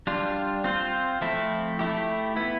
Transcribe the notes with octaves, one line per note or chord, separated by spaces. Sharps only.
G3 D4 F4
C4 F4 C5
F3 A3 C4 E4
A3 E4 G4
B3 E4 B4